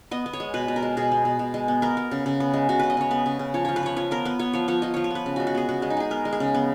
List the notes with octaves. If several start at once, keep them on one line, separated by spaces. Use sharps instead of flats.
B3 D#5
B3
C#5
G#3
B2 B4
B2
A#4
G#3
B2 G#4
B3
B2
B2
G#3
B3
B3 A#4
B3
C#3
C#3
B3
G#3
C#3 F#4
C#3 B4
D#5
C#3 C#5
B3 B4
C#3
C#3
F3 C#5
F3 C#5
B4
F3 C#5
F3 C#5
B3 A#4
B3 B4
B3 C#5
F3 C#5
F3 C#5
F3 D#5
F3 C#5
C#5
B3 B4
C#3
G#3 F#4
F#4
B3 G#4
C#3 F#4
G#3
D#4
G#3 G#4
B3 A#4
G#3
G#4
C#3
B3